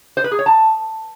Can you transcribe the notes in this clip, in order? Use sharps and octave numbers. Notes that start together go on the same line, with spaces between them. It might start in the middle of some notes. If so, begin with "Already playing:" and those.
C5
B4
G#4
C#5
A5